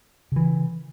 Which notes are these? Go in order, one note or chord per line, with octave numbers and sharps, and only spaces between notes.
C#3 E3